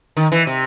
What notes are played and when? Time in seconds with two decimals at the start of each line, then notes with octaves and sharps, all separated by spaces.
0.17 D#3
0.32 E3
0.47 C3